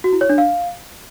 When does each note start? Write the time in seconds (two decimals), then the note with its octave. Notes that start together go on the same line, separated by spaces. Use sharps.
0.04 F#4
0.13 E4
0.21 C#5
0.30 D4
0.38 F5